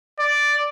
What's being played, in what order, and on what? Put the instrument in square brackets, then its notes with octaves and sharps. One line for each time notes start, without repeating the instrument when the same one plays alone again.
[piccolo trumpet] D5